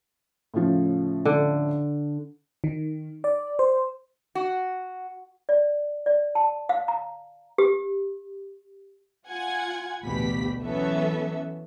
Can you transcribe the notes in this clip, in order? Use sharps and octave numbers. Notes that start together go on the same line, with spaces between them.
A2 C#3 F3
D3
D#3
D5
C5
F#4
D5
D5
A5
F5
A#5
G4
F4 F#5 G#5 G#6
A1 D2 B2 G4 B5 B6
E3 F#3 B3 C#4 A4 E5